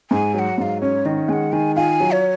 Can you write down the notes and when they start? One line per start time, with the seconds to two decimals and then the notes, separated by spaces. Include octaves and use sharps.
0.11 G#2 G#5
0.34 F#3 G#5
0.39 F#5
0.58 G#2 F#5
0.62 F5
0.82 C#4 C#5
1.05 D#3 D#5
1.28 G#3 G#5
1.33 F#5
1.53 D#3 G#5
1.76 F4 G#5
2.00 F#3
2.12 C#5